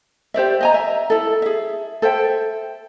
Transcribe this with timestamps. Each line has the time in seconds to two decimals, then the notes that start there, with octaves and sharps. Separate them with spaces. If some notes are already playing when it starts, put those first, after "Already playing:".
0.34 G4 C5 D5 E5
0.61 D#5 G#5 A#5
0.74 E5
1.10 E4 A4
1.42 G#4 E5
2.02 A4 C5 E5 G5